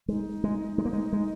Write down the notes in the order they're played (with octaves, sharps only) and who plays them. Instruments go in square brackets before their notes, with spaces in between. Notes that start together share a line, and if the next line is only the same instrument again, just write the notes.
[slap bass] G#3 [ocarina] D#4
[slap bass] G#3
G#3
A#3
G#3
G#3